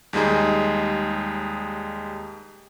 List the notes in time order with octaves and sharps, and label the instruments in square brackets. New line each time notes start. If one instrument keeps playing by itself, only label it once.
[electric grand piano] D#2 G3 G#3 D#4 G#4